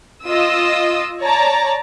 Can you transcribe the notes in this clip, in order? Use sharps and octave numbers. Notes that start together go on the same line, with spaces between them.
F4 D#5 D#6 E6
C#5 D5 A5 A#5